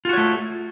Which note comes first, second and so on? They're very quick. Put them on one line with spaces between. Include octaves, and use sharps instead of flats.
F4 F#4 C#5 A3